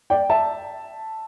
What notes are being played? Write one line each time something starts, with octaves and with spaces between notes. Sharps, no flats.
D5 G5
E5 A5